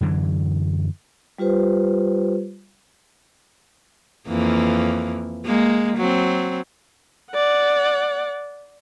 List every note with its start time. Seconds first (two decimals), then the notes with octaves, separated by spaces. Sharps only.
0.01 F#2 D3 E3 F#3
1.38 G3 F4 G4 B4 C5
4.28 F2 E3 A#3
5.45 G#3 A#3
5.97 F#3 C4
7.34 D5 F#5